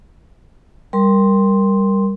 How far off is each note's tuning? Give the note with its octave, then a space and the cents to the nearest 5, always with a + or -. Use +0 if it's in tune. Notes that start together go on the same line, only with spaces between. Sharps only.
G3 +5 A#4 +0 C6 +0